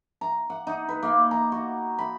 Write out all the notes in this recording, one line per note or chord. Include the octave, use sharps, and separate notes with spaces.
A#5
F#5
D#4
B4
A#3
A#5
F#4
B5